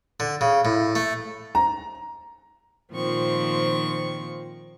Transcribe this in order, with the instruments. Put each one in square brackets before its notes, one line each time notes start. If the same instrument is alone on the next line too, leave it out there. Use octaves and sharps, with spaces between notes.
[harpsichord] D3
C#3
A2
A3
[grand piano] A#5
[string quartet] A#2 D#3 F3 C4 C#6